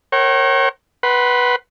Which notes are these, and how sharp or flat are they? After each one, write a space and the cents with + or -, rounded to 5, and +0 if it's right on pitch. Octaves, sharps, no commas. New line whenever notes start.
A#4 +0 C#5 -35 G5 -45
B4 -10 F#5 +20 C6 +0